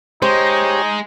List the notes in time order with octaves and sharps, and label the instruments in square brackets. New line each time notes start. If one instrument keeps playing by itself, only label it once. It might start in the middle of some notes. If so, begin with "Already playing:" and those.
[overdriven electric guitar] G#3 [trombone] D#4 [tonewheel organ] G4 C#5 [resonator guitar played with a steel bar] C5